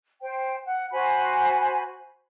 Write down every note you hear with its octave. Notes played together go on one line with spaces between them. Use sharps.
C5 G5
F#5
F#4 C5 G#5 B5